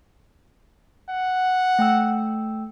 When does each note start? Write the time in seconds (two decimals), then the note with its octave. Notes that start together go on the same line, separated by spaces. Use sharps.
1.09 F#5
1.79 A3 G5 E6